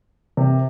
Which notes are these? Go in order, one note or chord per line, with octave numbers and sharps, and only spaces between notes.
C3